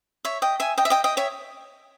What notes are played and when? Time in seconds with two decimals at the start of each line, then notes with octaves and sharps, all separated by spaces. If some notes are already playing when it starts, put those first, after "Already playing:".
0.25 C#5 E5
0.42 D#5 G5
0.60 E5 G#5
0.78 D#5 G5
0.85 E5
0.90 D#5 G5
1.04 D#5 G5
1.17 C#5 E5